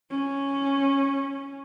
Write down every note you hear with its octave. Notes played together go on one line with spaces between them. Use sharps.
C#4